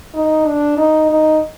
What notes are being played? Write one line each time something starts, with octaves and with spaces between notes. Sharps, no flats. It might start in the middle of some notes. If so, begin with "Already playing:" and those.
D#4
D4
D#4
D#4